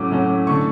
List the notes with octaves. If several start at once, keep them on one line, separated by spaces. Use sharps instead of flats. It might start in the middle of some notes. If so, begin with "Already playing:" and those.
Already playing: A2 F#3 C#4 D6
A2 F#3 C#4
D3 A3 C#6